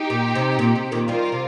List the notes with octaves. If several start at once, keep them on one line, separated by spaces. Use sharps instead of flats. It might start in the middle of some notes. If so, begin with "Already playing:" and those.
Already playing: D#4 G4
A#2
C3
A#2
C3
A#2 D#3
D#3 G3 F4 A#4
C3